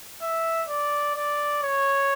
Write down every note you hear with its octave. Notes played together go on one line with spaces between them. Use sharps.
E5
D5
D5
C#5